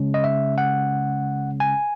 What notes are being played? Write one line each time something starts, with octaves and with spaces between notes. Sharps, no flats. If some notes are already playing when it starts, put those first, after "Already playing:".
Already playing: C#3 G#3 C#4
D#5
E5
F#5
G#5